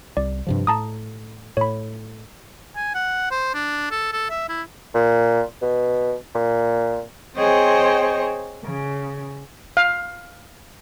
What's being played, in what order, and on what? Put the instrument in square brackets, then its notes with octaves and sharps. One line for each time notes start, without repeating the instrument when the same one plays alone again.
[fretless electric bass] C2 [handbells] D5
[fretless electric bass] G2 C3 F3
[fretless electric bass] A2 [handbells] A5 A#5 D#6
[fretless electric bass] A2 [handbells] C#5 B5
[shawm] G#5
F#5
C5
D4
A4
A4
E5
E4
[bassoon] A#2
B2
A#2
[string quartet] C4 G#4 C5 C#5 D#5 G5
C#3
[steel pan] F5